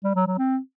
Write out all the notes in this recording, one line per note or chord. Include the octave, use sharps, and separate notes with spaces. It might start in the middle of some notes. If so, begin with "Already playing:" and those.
G3
F#3
F#3
C4